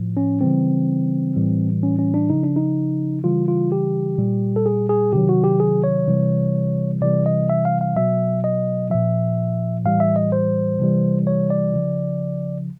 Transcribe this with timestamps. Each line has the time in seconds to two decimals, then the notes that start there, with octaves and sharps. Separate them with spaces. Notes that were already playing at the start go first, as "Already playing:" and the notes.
Already playing: A2 F3
0.17 C#4
0.41 C#3 E3 G3 C4
1.36 A2 E3 G3
1.83 C#4
1.99 C#4
2.14 D4
2.30 C#3 F3 D#4
2.43 D4
2.56 D#4
3.24 C#3 E3 G3 F4
3.48 F4
3.72 G4
4.18 A#2 G3
4.56 A4
4.66 G#4
4.89 G#4
5.13 C3 D#3 F#3 G4
5.29 F#4
5.44 G4
5.60 G#4
5.84 C#5
6.08 C3 E3 G3
7.01 C3 E3 G3 D5
7.26 D#5
7.50 E5
7.65 F5
7.81 F5
7.96 B2 F#3 E5
8.44 D#5
8.90 A#2 F3 E5
9.85 A2 E3 G3 F5
10.00 E5
10.16 D#5
10.32 C5
10.80 C3 E3 G3
11.27 C#5
11.50 D5
11.74 C#3 F3